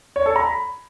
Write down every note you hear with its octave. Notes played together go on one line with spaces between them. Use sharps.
C#5
A4
A#5
B5